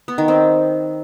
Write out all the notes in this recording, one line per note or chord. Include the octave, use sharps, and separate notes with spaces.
B3
D#3
C4